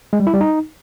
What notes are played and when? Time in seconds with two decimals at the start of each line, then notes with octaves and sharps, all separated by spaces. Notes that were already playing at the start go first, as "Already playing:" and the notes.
0.13 G#3
0.20 G3
0.27 E4
0.34 G3
0.41 D#4